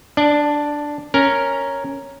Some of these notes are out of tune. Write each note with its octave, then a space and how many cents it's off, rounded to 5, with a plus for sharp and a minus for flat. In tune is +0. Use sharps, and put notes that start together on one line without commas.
D4 +0 D5 +25
C#4 +0 A#4 +0